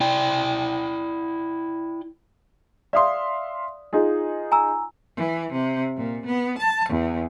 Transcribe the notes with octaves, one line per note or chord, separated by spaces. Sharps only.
E4 D5 G5
D5 E5 F5 C6 D#6
D#4 F4 G#4
G#5 A#5 E6
E3
C3
A#2
B3
A5
E2